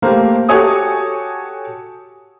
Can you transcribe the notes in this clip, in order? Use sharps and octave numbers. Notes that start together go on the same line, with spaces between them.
A3 A#3 G4 C5
F#4 G4 A4 C#5 G#5 D#6